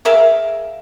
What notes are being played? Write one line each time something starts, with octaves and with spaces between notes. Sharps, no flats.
G#4 A#4 E5 F5